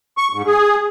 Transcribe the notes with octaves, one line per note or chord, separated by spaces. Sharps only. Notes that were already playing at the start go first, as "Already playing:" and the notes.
C#6
G#2
G#4